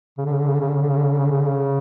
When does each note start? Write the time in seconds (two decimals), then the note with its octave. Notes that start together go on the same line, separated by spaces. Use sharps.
0.18 C#3
0.26 D3
0.32 C#3
0.40 D3
0.47 C#3
0.54 D3
0.60 C#3
0.68 D3
0.75 C#3
0.82 D3
0.89 C#3
0.97 D3
1.03 C#3
1.11 D3
1.18 C#3
1.25 D3
1.31 C#3
1.39 D3
1.46 C#3